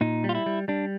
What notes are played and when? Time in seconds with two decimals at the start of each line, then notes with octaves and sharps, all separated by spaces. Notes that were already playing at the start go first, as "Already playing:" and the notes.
0.01 A#2 D#4
0.24 G3
0.29 F4
0.35 E4
0.46 G3
0.68 G3 D4